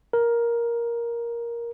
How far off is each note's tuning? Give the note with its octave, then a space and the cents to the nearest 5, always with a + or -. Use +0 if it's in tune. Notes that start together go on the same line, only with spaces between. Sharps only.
A#4 +10